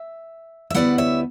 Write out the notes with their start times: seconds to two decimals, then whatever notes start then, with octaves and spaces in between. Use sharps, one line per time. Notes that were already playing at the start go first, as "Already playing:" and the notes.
Already playing: E5
0.70 E5
0.74 D2 D3 G3 B3 E4 D5 F#5
0.98 C#5 E5